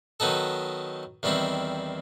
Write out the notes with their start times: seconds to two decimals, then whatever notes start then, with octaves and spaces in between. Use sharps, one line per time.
0.20 D#3 F#3 B3 D#4 A4
1.23 E2 D#3 G3 C4 E4